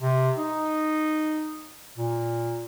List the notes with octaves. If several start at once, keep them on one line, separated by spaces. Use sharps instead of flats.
C3
D#4
A#2